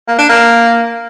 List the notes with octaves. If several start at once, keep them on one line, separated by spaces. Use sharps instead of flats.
A#3
D4
A#3